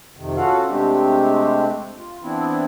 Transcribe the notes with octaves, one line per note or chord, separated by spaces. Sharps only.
F2 C3 D#3
C#4 F4 F#4 A4 F5 F#5
C3 G#3 A3 C4 D4 G4
F4
E3 B3 C4 D4 E4